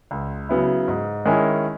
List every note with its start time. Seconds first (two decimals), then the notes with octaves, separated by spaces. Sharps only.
0.11 C#2
0.49 C#3 F#3 B3 E4
0.88 G#2
1.25 D#3 G#3 C#4 E4